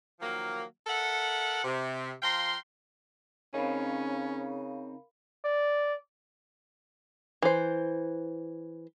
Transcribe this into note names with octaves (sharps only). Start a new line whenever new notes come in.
D#3 F3 F#3 A#3
A4 A#4 E5 F#5
C3
F3 F5 G5 A#5 C6
C#3 C4 C#4 D#4 A#4 F5 B5
D5
E3 C5